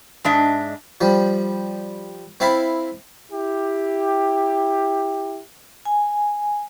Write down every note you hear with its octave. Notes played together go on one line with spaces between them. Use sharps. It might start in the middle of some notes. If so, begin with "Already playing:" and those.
G#2 D4 D#5 E5
F3 G3
C4 E4 F5 A5 B5
E4 G4
G#5